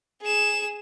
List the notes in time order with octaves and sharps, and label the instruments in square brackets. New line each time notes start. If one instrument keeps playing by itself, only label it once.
[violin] G#4 E7